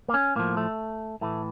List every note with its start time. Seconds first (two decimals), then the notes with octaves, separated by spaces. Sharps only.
0.08 A#3
0.14 C#4
0.36 A2 F3 A#3
0.57 A3
1.21 A2 E3 A3